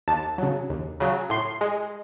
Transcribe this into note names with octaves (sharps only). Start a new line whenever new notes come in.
D#2 A5
C#3 F#3
D#2
C#3 F#3
A2 C6
G#3